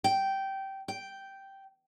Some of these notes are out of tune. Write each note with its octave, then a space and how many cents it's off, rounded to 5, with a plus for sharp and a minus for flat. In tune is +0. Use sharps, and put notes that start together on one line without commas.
G5 -15
G5 -5